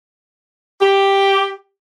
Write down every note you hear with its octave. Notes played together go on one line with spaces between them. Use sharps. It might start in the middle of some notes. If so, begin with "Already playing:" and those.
G4